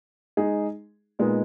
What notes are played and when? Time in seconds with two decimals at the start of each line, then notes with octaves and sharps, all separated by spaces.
0.37 G#3 D#4 G#4
1.19 A#2 G#3 B3 D#4